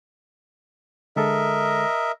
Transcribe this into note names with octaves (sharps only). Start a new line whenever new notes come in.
D3 G#3 A4 A#4 D#5 E5